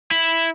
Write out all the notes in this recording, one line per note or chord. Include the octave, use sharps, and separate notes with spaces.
E4